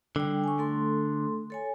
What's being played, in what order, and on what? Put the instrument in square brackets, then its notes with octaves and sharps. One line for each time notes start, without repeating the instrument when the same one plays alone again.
[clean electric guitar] D3 [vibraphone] G3 G5
[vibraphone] G#5 C#6
A3 A4 C6
A4 C#5 G#5